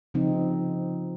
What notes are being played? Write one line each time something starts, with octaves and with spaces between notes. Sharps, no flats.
C#3 F3 C4 D#4